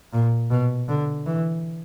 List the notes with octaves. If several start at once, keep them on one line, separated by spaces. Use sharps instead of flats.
A#2
B2
D3
E3